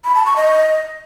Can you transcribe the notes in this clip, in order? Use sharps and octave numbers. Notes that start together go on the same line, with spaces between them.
B5
A5
C#6
D#5